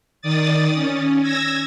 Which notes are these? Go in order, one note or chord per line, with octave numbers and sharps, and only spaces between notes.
D#3 D5 D#6 A6
C#4
E6 G#6 A#6